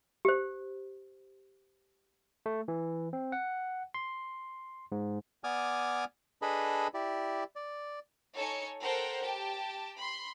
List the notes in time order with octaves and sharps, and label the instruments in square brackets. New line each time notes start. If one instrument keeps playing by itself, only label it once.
[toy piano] G4 C5
[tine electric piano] A3
E3
C4
F#5
C6
G#2
[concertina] B3 D5 G#5 D6 D#6 F6
D4 G#4 A4 B4 D#5 B5
E4 G4 D5
D5
[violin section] D#4 A4 C#5 G#5 C#7
A4 A#4 C5 F#5 G5 A5
G4 G5 A5
B5 C6